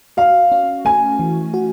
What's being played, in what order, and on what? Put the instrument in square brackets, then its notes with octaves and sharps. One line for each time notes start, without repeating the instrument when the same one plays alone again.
[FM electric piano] F#4 [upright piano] F5
[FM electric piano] C#4
[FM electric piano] A3 [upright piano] G#5
[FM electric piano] E3
F#4